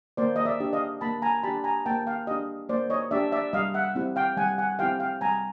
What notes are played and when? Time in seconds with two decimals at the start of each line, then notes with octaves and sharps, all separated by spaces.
0.17 A#3 C5 D5
0.36 D#5
0.45 D5 E5
0.60 D4 G4
0.73 D#5 F5
1.01 A#3 A5 B5
1.22 G#5 A#5
1.43 D4 G4 A5 B5
1.64 G#5 A#5
1.86 A#3 G5 A5
2.07 F5 G5
2.27 G4 D#5 F5
2.31 D4
2.69 A#3 C5 D5
2.90 C#5 D#5
3.11 D4 G4 D5 E5
3.32 D5 E5
3.53 G3 D#5 F5
3.74 E5 F#5
3.95 C4 E4 G4
4.16 F5 G5
4.37 G3 F#5 G#5
4.58 F#5 G#5
4.79 C4 E4 G4 F5 G5
5.00 F5 G5
5.21 G3 G#5 A#5